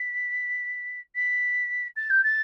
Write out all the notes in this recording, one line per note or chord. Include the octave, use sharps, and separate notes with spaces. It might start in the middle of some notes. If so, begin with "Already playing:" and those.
Already playing: B6
B6
A6
G6
A6